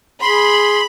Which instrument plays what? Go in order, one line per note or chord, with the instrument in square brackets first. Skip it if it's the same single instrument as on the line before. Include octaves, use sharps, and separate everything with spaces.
[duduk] G#4 [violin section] B5 [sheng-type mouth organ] C6